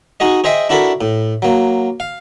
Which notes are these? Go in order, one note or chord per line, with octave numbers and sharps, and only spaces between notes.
D#4 F#4 G#4 D#5
G#4 C5 D#5 E5 G5
D4 E4 F#4 A4 A#4 B5
A2
F#3 A#3
F5